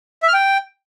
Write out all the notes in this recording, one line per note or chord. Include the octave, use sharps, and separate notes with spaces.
E5
F6
G5